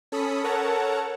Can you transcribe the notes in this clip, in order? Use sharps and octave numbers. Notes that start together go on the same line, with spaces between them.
C#4 A4 B5 D#6 B6 C#7
A4 A#4 C#5 F#5 A5 A#5